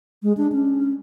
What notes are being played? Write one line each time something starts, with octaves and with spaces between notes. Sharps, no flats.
G#3
D4
C#4